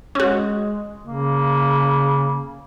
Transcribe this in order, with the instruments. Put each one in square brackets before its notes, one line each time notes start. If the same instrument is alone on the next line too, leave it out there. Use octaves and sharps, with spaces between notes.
[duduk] G#3 [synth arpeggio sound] C#4 F#4
[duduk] C#3 [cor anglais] A#3